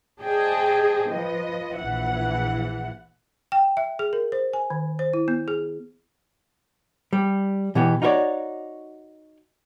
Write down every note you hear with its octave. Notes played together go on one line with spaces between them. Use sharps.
G#4 C5 D5 D#5 G5 A5
F3 B4 D#5
A#1 E3 E5 F#5
G5
E5
G#4
A#4
C5
G#5
D#3
C5
E4
B3
G#4
G3
B2 E3 B3 G4
D#4 F4 F#4 A#4 C#5 D5